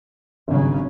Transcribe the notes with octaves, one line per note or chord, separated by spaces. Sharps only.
G#1 G2 C#3 F#3